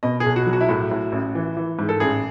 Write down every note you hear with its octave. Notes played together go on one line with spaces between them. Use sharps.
B2 D#5
G#4
B1
F#4
F#3
F#4
E4
A2 F#4
A2
A1
E3
E3
G#2
A4
A1 G#4